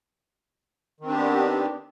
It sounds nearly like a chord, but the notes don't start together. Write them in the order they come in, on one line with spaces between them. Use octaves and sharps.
D#3 C4 D4 G4 B3